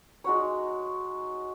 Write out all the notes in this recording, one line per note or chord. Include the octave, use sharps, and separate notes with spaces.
G#3 D#4 F#4 C#5